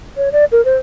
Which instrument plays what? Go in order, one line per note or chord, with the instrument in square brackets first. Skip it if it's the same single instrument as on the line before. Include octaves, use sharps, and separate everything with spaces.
[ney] C#5
D5
A#4
C5